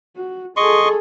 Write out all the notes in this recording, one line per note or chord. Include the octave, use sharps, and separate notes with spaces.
F#4
G#4 A4 D#5 C6 C#6